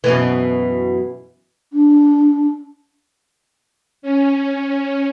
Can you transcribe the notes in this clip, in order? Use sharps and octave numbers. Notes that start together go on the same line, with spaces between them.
F#2 B2 E3
D4
C#4